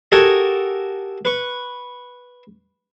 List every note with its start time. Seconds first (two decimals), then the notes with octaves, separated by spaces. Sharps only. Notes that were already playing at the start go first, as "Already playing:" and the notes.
0.12 F#4 G4 A4 A#4 D#5 G#5
1.25 B4 C#6